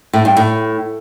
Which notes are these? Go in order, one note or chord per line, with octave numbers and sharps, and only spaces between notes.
A2
G2
A2